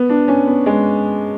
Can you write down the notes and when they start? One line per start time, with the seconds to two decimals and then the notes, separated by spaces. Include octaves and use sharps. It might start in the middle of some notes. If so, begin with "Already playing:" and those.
Already playing: B3
0.09 D4
0.28 C#4
0.47 B3
0.66 G#3